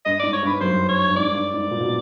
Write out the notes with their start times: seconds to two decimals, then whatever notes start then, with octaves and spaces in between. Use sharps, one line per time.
0.05 G2 D#5
0.20 G#2 D5
0.33 C#5
0.43 G2
0.47 B4
0.61 F#2 C5
0.89 C#5
1.09 G2
1.16 G#2 D5
1.35 G2
1.54 G#2
1.71 A#2
1.81 B2